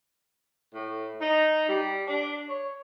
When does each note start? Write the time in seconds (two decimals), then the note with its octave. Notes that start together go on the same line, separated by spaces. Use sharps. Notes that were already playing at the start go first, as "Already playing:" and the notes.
0.73 A2
1.20 D#4
1.68 G3
2.07 D4
2.48 C#5